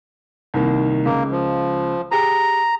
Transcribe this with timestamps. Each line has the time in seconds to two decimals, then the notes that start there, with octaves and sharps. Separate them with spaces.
0.54 C2 D#3 A#3
1.05 C#2 A#3
1.31 F3
2.11 G4 G#4 A#5